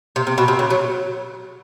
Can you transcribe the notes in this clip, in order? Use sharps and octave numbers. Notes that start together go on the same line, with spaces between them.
C3
C3
B2
C3
C#3
F#3